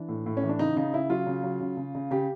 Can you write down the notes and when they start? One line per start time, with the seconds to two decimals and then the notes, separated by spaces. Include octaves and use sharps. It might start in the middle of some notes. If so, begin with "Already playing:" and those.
Already playing: E3 D4
0.09 A2
0.26 A2
0.37 C#4
0.43 E3
0.49 D4
0.59 C#3 D#4
0.77 C#3 D#4
0.94 C#3 E4
1.09 F#3 F4
1.27 C#3
1.43 F#3
1.61 C#3
1.77 C#3
1.95 C#3
2.11 C#3 G4